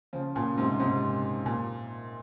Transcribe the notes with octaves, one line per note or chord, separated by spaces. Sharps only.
C#3 F3
A#2 C#3
G#2 C3
G#2 C3
A#2